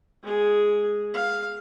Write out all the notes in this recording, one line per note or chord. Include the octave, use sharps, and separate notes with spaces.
G#3 G#4
F5